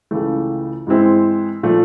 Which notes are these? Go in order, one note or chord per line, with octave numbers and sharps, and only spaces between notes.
C#2 C#3 E3 A3
G#2 E3 G#3 C4 E4
A#2 F3 A3